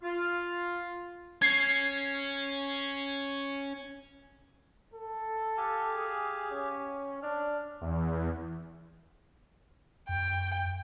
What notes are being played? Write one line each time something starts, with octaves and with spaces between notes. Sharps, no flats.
F4
C#4 G#6 C7
A4
G4 F5 G#5
G#4
C#4
D4 F6
E2
F#2 G5